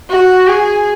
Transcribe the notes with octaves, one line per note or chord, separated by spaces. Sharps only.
F#4
G#4